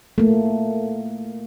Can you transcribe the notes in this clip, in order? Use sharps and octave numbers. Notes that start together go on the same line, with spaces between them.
A3 A#3